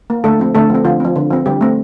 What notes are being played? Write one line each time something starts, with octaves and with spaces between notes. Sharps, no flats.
A#3
D3 A3 A4
F3 C4
D3 A3 A4
F3 C4
D3 F3 F4
F3 C4
D3
F3 C4
D3 G3 G4
A3 C4